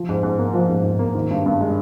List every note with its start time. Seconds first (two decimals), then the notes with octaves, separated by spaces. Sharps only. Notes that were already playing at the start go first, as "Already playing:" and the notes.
Already playing: F3
0.09 G#2
0.23 G#2
0.38 A#3
0.54 F3
0.69 G#2
0.84 G#2
0.99 A#3
1.15 D#3
1.31 G2
1.46 G2
1.61 G#3